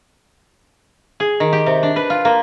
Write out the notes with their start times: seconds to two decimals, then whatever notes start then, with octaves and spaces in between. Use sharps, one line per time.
1.20 G#4
1.40 D#3
1.53 G4
1.66 C3
1.83 D4
1.96 B4
2.10 F4
2.25 A#3